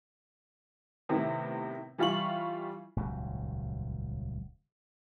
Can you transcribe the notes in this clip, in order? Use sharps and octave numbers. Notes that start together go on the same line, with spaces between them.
A2 C3 D#3 B3 E4
E3 G3 F4 F5 C#6 F#7
D#1 C#2 G#2 F#3